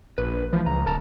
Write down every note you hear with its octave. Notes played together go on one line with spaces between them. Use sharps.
A#1 B4
E3 F3 A3
C#2 A#5
D1 A#4 A5 A#5